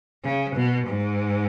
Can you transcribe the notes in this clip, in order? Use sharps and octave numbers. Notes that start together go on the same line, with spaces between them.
C#3
B2
G#2